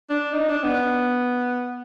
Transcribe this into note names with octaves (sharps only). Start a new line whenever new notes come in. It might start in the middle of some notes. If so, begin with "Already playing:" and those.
D4
D#4
D4
B3